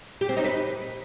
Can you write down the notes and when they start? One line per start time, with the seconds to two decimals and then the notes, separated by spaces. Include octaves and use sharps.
0.21 G4
0.29 C4
0.37 D#4
0.45 B4